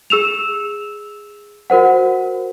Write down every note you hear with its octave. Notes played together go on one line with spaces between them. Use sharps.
G#4 E6 E7 F7
F#4 A#4 C5 F#5